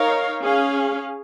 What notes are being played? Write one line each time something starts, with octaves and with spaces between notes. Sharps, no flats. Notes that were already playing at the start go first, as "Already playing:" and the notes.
Already playing: D#4 A#4 C#5 F5
C#4 G#4 F5